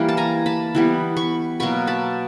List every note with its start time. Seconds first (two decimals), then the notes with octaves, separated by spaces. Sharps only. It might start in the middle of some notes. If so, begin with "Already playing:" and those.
Already playing: E3 G3 A#3
0.09 A5
0.17 G#5 A#5
0.46 A5 B5
0.75 E3 G3 B3
1.17 B5 C#6
1.60 B2 F#3 A#3 B5 C#6
1.87 A5 B5